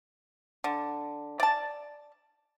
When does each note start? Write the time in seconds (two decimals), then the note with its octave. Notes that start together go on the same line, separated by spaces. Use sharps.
0.64 D3
1.40 D5 A5